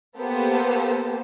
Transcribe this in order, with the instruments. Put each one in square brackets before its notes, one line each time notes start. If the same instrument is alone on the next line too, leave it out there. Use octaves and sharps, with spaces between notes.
[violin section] A#3 B3 G4 A4 C5